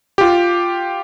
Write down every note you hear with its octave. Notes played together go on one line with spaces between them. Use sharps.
F4 G4